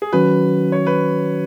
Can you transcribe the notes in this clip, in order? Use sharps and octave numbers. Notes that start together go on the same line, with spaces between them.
G#4
D#3 F#3 C#4 F#4 B4
C#5
B4